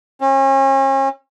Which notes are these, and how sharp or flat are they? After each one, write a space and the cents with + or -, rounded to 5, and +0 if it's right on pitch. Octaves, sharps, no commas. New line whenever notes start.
C#4 -40